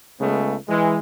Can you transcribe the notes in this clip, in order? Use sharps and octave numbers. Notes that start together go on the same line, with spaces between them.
C#2 C#3 G#3 A3 B3
E3 G#3